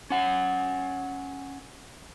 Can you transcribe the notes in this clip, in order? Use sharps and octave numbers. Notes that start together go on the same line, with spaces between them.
C#4 F#5